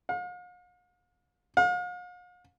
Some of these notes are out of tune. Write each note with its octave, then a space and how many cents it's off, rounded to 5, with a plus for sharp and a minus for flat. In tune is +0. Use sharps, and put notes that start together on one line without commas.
F5 +45
F5 +45